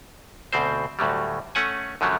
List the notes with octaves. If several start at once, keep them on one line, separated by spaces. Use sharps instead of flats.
D2 B2 C4 C5
D2 A2 F#3 G3
A3 C#4 F#5 G#5
F#2 D3 F3 F#3 A3